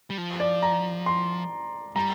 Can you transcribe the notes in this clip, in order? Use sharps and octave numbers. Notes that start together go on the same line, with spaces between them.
G3
F3
D5
A#5
C6
G3 A#5